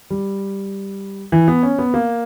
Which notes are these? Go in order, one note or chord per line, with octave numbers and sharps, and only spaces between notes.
G3
E3
B3
C#4
B3
A#3